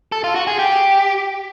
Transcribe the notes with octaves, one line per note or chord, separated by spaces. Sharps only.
A4
F4
F#4
G#4
G4